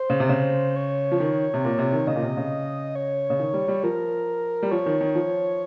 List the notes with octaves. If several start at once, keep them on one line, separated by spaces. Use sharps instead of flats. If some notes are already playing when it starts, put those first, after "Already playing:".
Already playing: C5
C#3
C3
C#3
C#5
F3
D#3
C3
A#2
C3
D#3
C#3 D#5
A#2
C3
C#3
C#5
C#3
D#3
G3
G3
F3 A#4
G3
F3 C#5
D#3
D#3
F3